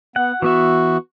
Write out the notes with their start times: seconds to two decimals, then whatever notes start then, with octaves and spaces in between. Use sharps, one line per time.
0.16 B3 F#5
0.42 E3 B3 F#4 E5